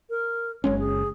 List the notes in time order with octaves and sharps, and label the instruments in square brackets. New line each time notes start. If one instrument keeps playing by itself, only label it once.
[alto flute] A#4
[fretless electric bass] F#1 G#3 C#4 [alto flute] C#5
[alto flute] G#4